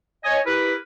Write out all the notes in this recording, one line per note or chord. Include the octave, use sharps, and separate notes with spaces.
C#5 D#5 G#5
E4 G4 A#4 B4